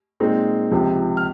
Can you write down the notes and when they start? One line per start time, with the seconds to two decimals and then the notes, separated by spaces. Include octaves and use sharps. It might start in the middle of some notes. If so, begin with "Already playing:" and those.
0.20 A#2 G#3 C4 D#4
0.71 C#2 C3 F3 C4
1.17 F6